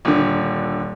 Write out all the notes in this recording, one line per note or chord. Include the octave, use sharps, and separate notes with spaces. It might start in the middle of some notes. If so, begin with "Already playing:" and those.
D#1 D3